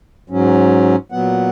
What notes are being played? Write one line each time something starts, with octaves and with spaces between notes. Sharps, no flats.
G#2 F#3 C#4
A#2 F#3 B3 F#5